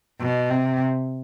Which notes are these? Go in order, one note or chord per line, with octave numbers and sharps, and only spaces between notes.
B2
C3